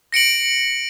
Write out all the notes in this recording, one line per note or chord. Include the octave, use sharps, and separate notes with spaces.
A#6 C#7 D7 F#7